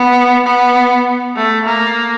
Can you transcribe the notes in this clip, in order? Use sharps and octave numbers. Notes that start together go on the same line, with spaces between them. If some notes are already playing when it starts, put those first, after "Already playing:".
Already playing: B3
B3
A3
A#3